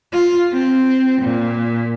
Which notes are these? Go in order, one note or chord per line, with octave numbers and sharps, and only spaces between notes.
F4
C4
A#2